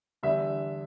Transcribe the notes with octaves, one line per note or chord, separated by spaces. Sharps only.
E2 D3 G3 E5